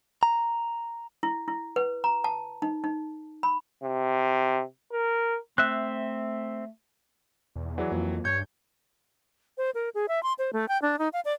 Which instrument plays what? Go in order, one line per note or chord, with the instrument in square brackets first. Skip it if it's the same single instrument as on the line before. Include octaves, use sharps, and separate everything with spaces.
[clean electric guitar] A#5
[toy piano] E4
E4
B4
A#5
A5
D#4
D#4
B5
[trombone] C3
A#4
[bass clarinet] A3 [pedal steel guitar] C4 E5 [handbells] F#6
[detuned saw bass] E2 [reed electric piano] B2
[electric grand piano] E3 F#3 [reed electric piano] G#4 D5 F#5
[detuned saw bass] F2 [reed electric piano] A#3 F4
[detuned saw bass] G2 [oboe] C#5 [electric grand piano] G6
[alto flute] C5
A#4
G#4
E5
C6
C5
A3
G5
D4
D#4
F5
D5